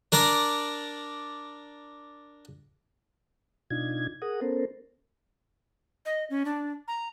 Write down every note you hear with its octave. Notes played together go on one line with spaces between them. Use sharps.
D4 A#4 D5 A#5
B2 D4 D#4 F4 G#6
G#4 A#4 F#5 D#6
B3 C#4 A4 A#4 C5
D#5
C#4
D4
A#5